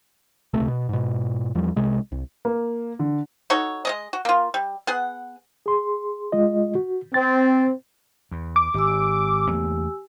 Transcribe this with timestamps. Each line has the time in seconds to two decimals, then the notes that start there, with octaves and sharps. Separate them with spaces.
0.53 D#1 C#2 C3 A3
0.68 B2
0.89 G#2 B2
1.55 E2 F3 G3
1.76 C2 C3 G#3
2.12 C2
2.45 A#3
2.99 D3
3.50 D#4 F#4 A4 C#5
3.85 G#3 C#4 D#5
4.13 F#4
4.25 A#3 F4
4.54 G3
4.87 B3 G#4 F#5
5.66 G#4 C6
6.32 G#3 F4 D#5
6.75 F#4
7.14 C4 A6
8.31 E2
8.56 D6
8.74 G#1 G4 G#5 E6
9.48 E2 A3 A#3